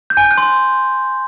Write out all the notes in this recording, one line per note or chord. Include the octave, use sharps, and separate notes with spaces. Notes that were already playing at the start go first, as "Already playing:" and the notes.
G6
G#5
G6
F#6
C6